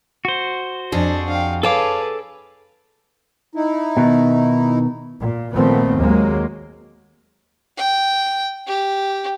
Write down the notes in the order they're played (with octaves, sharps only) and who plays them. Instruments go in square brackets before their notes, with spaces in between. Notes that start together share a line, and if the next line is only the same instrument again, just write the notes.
[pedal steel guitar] F#4 C5
[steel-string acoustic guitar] F2 G#4 [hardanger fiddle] D4
[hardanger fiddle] F5 G5
[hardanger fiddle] G#4 B4 [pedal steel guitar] A4 A5 D6 [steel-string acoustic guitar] C#5 F5
[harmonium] D#4 E4
[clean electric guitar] B2 D#3
[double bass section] A#2
A#2 D#3 F3 A3 B3 C4
D#2 F#3 G#3 A#3
[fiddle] G5
G4